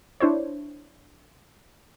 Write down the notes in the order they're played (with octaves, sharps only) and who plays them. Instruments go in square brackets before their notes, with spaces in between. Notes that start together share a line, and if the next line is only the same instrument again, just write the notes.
[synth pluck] D4 E4 C5 C#5